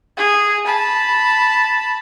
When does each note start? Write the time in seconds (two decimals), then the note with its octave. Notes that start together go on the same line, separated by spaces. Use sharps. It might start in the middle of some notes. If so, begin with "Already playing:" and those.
0.17 G#4
0.66 A5 B5